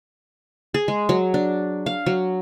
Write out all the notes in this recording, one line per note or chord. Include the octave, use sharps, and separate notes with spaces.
G#4
G#3
F#3
D4
F5
F#3